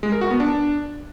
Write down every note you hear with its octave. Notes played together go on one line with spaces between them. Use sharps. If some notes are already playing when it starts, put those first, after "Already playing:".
G#3
A#4
F#4
B3
D4